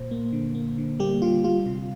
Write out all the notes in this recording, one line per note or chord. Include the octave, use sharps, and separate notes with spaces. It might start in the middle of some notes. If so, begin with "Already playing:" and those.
Already playing: A#2 C5
A#3
D3
A#3
D3
G3 A#3 G4
D3 F4
G3 F4
C3